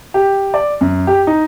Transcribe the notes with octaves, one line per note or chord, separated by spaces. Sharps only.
G4
D5
F#2
G4
D#4